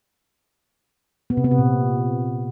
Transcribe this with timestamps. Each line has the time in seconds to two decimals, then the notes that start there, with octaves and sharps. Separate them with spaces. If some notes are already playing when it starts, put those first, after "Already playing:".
1.30 B3
1.37 C3
1.44 B3
1.51 C3
1.58 A#2